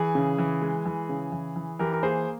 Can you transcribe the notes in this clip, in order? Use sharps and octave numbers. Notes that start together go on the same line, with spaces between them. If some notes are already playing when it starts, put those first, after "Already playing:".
Already playing: E3 G#4
C#3
E3
G#3
E3
C#3
E3
E3
E3 G4 A#4
A#4
A#3 G#4 C5